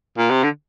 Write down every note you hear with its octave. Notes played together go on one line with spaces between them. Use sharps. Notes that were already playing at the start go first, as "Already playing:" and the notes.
A#2
C3
D3